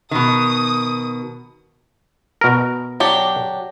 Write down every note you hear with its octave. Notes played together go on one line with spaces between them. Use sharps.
B2 D#3 D#6
B2 A#4
F#3 D4 G4